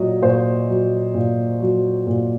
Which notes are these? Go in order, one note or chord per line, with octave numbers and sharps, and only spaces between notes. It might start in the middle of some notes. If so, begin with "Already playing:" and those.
Already playing: A#2 F#3 C#5 D#5
A#2 C5
F#3
A#2
F#3
A#2